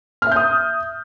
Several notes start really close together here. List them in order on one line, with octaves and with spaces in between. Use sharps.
F6 E5 G6 D#6